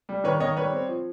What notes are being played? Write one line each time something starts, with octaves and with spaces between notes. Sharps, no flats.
G3
D#3 B4 C#5
D#3 C#5 D#5
G3 B4 C#5
C4
F3